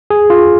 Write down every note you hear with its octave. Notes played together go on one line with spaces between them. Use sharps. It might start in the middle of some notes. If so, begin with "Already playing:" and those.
G#4
F4